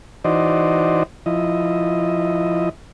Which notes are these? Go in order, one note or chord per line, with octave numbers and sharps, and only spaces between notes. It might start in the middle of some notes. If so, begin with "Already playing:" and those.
E3 D#4 F#4 C5 D5 D#5
F3 E4 D#5